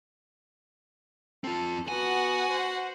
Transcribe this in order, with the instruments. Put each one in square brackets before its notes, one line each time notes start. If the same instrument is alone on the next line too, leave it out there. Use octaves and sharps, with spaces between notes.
[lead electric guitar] C4 F4 [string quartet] A4
[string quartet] B3 [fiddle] F#4 F#5 [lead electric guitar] G#5
[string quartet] C5